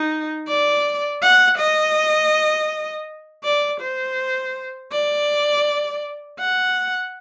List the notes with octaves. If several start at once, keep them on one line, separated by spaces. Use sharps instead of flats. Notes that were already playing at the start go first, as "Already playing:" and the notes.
Already playing: D#4
D5
F#5
D#5
D5
C5
D5
F#5